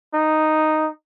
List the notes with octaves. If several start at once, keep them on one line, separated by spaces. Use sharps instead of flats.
D#4